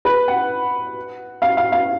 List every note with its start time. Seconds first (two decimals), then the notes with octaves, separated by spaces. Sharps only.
0.05 B4
0.28 F#5
1.42 F5
1.57 F5
1.72 F5